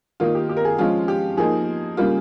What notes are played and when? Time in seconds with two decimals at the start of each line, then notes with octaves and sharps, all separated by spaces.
0.20 D#3 A#3 D#4 F4
0.35 G4
0.49 G4
0.57 A#4
0.65 G#4
0.78 F3 G#3 C#4 F4
1.08 G4
1.37 F3 A#3 D#4 G#4
1.97 C#3 G3 A#3 F4